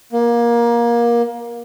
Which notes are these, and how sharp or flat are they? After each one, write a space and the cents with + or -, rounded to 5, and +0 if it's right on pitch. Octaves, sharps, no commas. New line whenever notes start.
A#3 +20